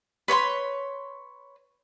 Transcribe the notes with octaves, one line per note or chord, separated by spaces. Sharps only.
B4 C#5 B5 C6